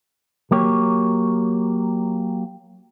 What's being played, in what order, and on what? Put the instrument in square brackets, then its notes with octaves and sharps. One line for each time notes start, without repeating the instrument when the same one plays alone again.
[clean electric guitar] F#3 A#3 G4 C#5